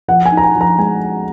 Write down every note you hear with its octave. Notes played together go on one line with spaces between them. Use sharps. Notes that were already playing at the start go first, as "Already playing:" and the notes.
F3 F#5
G#5
D#4
A#5
G#5
F3
A#5
G#3 G#5